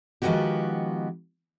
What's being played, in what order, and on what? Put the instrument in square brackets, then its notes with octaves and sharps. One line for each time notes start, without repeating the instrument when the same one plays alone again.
[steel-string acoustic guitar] D#3 F3 G#3 B3 F#4 G4